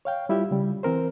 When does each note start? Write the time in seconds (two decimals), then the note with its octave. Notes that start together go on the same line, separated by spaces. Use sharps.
0.05 C#5 F5 G5
0.29 G3 E4 F4 G4 E5
0.51 C#3 G3
0.83 E3 C4 A#4 C5